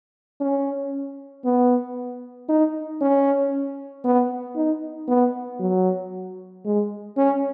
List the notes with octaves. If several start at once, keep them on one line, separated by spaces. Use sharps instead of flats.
C#4
B3
D#4
C#4
B3
D#4
B3
F#3
G#3
C#4